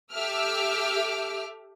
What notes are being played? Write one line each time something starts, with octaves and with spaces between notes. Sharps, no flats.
G4 A4 E5 D6 E6 F6